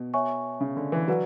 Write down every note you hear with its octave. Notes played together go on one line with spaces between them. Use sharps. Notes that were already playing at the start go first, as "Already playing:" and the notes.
Already playing: B2
C#5 E5 G#5 C#6
C#3
D3
E3
F#3 B4 D5 F#5